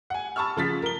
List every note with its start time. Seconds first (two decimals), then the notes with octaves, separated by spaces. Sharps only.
0.10 F#5 G#5
0.36 A5 B5 C#6 E6 F6
0.57 C#3 F3 A6 B6
0.82 A#4 G7